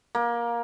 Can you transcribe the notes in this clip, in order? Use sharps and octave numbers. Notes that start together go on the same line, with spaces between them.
A#3